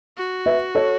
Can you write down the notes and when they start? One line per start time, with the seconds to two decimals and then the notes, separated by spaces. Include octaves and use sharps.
0.17 F#4
0.46 B4 E5
0.75 A4 C#5